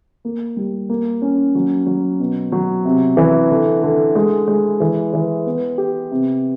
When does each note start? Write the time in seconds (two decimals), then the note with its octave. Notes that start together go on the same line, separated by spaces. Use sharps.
0.25 A#3
0.57 G3
0.89 A#3
1.22 C#4
1.55 F#3
1.87 F#3
2.20 B2
2.52 F#3
2.85 C3
3.17 E3
3.50 D3
3.83 D3
4.15 G#3
4.48 G#3
4.80 E3
5.13 E3
5.46 B3
5.78 G4
6.11 C3